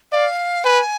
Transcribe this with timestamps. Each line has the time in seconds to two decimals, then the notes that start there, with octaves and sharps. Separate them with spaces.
0.12 D5 F5
0.64 B4 G#5